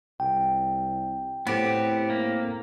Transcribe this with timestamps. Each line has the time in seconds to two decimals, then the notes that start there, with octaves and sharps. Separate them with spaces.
0.20 C2 G5
1.47 A2 B3 C4 G4
2.10 A#3